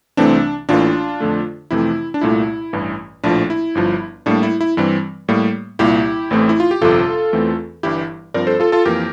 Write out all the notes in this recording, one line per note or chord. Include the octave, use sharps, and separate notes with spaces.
C2 C3 E3 A3 C4 D4
A1 A2 E3 A#3 D4 F4
F2 D3 A3
F2 C3 E3 A3 C4 E4
D4
C2 A#2 A3 E4
A1 G2 E3
A#1 A2 F3 A#3 D4
E4
G1 G2 F3
A2 G3 A#3 D4
E4
E4
G2 E3 G3 C4
A2 G3 A#3
C2 A#2 G3 A#3 E4 G4
A1 A2 E3 A3 C4
E4
F4
G4
G1 F2 C3 F4 A4
E2 E3 A3 C4
G1 G2 E3 G3 E4 G4
G2 F3 C4 A#4 D5
A4 C5
F4 A4
F4 A4
F2 E3 A#3 G4 A#4